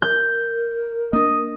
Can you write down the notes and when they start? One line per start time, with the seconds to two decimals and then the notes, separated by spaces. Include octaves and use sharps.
0.02 A#4 G6
1.13 A#3 D4 D#5